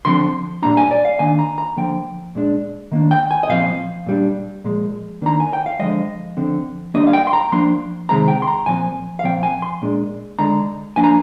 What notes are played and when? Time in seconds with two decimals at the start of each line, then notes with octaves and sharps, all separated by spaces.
0.05 D3 F3 C4 C6
0.62 A#2 G3 A#3 D4 A#5
0.77 G#5
0.91 D5
1.05 F5
1.19 D#3 A#3 D4 G#5
1.39 A#5
1.58 A#5
1.77 D3 F3 A#3 G5
2.35 A#2 G#3 D4
2.92 D#3 A#3 D4
3.11 G5
3.31 G#5
3.43 D#5
3.49 A#2 F3 C4 F5
4.06 A#2 G3 D4
4.64 A#2 F3 G#3
5.22 D#3 A#3 D4 A#5
5.40 G#5
5.53 G5
5.66 F5
5.79 D3 F3 G#3 D#5
6.37 D3 F3 C4
6.94 D3 G3 A#3 D4 D#5
7.07 F5
7.13 G5
7.27 C6
7.33 A#5
7.52 F3 A#3 D4 C6
8.09 C3 D#3 G#3 C4 A#5
8.28 G5
8.42 C6
8.47 A#5
8.66 A#2 F3 C4 G#5
9.19 F5
9.24 A#2 F3 C4 G5
9.43 G#5
9.62 C6
9.82 A#2 G#3 D4
10.39 D3 G#3 D4 A#5
10.96 F3 A#3 D4 G#5
11.04 A#5